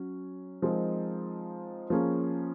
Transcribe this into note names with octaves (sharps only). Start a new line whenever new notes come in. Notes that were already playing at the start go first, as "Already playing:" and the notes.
Already playing: F#3 C#4
F3 G#3 C4 D#4 A#4
F3 A#3 C#4 G#4